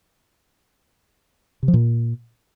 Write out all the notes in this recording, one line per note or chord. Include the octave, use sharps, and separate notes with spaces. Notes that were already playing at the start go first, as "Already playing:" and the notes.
C3
F3
A#2